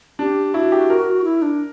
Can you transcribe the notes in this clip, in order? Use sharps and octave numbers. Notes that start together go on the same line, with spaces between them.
D4 G4
E4 F#4
G4
A#4
E4
D4